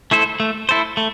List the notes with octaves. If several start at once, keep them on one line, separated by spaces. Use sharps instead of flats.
A3 E4 A4 C5
A3
E4 A4 C5
A3